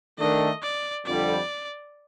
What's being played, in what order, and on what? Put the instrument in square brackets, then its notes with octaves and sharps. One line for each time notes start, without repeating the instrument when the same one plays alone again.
[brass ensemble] D#3 A3 D4 [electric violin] D#5
[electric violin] D5
[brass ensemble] F2 D3 G3 [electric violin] D5